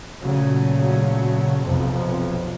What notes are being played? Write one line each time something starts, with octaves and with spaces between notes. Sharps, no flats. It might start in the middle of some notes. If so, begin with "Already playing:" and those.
A#2 C#3 F#3 A3
B1 F2 C3 F3